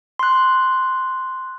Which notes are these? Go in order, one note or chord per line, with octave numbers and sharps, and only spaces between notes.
C6 F#6